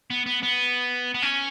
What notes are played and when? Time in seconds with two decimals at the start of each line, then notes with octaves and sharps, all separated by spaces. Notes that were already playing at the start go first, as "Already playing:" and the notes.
0.10 B3
0.26 B3
0.43 B3
1.14 B3
1.22 C#4